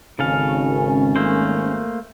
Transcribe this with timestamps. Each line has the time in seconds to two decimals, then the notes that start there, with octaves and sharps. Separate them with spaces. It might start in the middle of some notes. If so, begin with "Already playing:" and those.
0.19 G#1 C#3 C#4 A4 F5
1.16 A3 A#3 C5